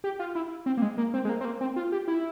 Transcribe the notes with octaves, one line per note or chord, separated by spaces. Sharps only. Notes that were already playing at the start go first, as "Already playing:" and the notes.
G4
F4
E4
C4
A#3
G#3
A#3
C4
G#3
A#3
C4
A#3
C4
F4
G4
E4